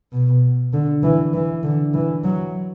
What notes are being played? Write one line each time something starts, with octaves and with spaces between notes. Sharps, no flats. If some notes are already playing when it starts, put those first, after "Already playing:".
B2
D3
E3
E3
D3
E3
F#3